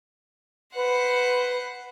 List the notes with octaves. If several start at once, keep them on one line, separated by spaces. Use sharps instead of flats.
B4 C5 F#5